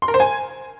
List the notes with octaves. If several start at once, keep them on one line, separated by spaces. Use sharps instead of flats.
C6
A#4
C5
G#5